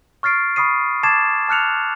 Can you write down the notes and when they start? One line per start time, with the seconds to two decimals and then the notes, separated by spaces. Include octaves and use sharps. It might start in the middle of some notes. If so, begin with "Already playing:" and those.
0.23 C#6 F6 A6 C7 D7
0.56 B5 C#6 D#6 C7 D#7
1.03 A5 D6 G#6 A6 C7 E7
1.49 A5 F6 F#6 C#7 F7